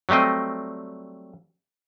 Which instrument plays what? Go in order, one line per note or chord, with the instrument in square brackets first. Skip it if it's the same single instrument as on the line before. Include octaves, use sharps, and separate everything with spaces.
[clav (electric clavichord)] F#3 G3 A3 C4 D#5